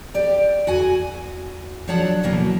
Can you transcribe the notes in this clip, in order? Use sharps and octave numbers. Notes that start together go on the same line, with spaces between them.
G4 D5
E2 F#4 F#5 G#5
F3 F#3 D4 C#5 F#5 A5
D2 B2 E3 F#3 A#3 C#4